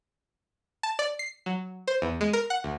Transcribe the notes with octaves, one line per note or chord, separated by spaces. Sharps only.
A5
D5
C7
F#3
C5
E2
G#3
A#4
F#5
D2